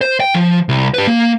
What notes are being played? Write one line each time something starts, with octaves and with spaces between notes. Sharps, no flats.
C5
G5
F3
C2
G4 B4
A#3